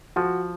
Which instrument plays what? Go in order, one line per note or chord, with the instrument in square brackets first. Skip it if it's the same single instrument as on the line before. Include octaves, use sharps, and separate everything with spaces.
[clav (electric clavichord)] F3 [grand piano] F#4